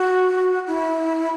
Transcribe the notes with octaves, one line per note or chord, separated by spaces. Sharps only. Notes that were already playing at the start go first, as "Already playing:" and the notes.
Already playing: F#4
E4